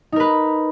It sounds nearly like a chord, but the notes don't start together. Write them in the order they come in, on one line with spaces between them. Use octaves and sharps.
D#4 A#4 B4